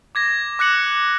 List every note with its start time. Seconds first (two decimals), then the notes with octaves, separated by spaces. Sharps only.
0.15 D6 G#6 A#6
0.59 D6 F#6 A#6 C#7 F#7